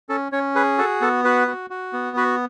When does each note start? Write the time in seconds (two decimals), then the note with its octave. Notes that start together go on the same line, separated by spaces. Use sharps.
0.09 C#4 A4
0.32 C#4 C#5
0.55 G#4 B4
0.78 F#4 A4
1.01 B3 A4
1.24 F#4 B4
1.48 F#4
1.70 F#4
1.93 B3
2.17 F#4 B4